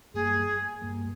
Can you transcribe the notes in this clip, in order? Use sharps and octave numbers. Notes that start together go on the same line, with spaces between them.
G2 G3 A#3 G#4
G2 G3 A#3